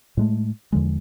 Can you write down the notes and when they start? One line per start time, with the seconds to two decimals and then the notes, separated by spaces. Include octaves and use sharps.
0.17 A2 G#3 A3
0.72 E2 D3 F3 G#3